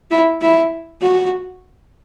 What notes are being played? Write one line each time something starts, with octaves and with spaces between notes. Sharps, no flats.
E4
E4
F#4